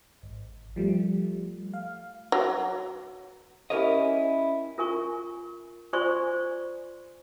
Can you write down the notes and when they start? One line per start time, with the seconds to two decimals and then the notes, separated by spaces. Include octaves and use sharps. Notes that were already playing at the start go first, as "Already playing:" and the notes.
0.22 G#1
0.76 F3 G3 A3
1.74 F5
2.32 F#3
3.70 C#4 E4 G4 A#4 C#5 D#5
4.78 F4 A#4 G#5 C#6
5.93 F4 C5 D5 G#5 C6 C#6